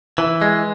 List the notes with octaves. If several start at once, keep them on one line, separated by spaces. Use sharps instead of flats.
E3
G#3